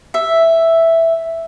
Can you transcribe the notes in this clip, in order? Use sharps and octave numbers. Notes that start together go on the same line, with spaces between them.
E5